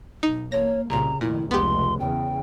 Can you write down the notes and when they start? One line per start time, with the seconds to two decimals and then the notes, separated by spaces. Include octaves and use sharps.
0.23 B1 D#4
0.52 A1 A#3 C#5 A#6
0.90 C2 A#2 C#3 A#5
1.21 F1 A#2 D#3 E4
1.51 F1 C#2 B3 G4 C6
2.00 E2 C#3 G5